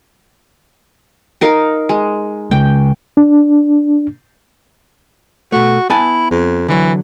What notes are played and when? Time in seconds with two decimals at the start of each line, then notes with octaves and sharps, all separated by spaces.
1.41 D#4 A#4 F5
1.89 G#3
2.51 C#3 G#3 G5
3.17 D4
5.52 B2 A3 F#4
5.90 B3 E4 G#5 A5
6.31 F2
6.68 D3 E3 F#3